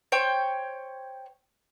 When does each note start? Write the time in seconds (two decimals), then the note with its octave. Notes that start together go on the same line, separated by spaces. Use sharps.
0.12 C5 C#5 G5